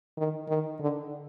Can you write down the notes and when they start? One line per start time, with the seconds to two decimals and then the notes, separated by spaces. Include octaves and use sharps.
0.17 D#3
0.48 D#3
0.80 D3